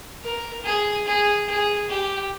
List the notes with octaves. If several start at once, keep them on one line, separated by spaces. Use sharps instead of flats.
A#4
G#4
G#4
G#4
G4